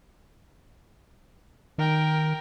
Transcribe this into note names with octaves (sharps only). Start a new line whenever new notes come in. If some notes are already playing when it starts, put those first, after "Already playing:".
D#3 A#4 G5